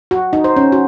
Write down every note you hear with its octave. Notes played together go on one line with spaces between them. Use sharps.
F#4
D#4
C5
C#4
F#4